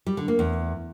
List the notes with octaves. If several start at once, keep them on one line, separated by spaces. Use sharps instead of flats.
G3
D3
A#3
E2